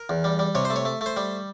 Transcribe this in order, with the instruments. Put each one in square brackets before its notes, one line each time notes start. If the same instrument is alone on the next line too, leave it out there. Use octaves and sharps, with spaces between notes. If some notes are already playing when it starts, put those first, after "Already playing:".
Already playing: [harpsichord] A#4
E2
G3
G3
C3 C#5
C5
A3
C#5
A3
A3
C5
G3